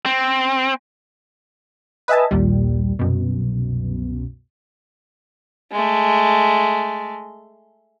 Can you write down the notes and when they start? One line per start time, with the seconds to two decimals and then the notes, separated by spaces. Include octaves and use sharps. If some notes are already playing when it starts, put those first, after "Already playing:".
0.06 C4
2.08 B4 D#5 E5 G#5 A5
2.31 A#1 D#2 A#2 G3
2.99 C2 F#2 B2
5.72 G#3 A3